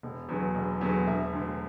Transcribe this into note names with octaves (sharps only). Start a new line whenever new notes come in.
E1
E2 D3 F#3
E1
E2 D3 F#3
E1 E5
D2 D3